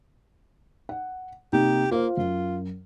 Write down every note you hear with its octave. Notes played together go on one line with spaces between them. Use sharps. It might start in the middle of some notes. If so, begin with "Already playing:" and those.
F#5
C3 A#3 D#4 G4
A#3 F4 C5 F5
F#2 F4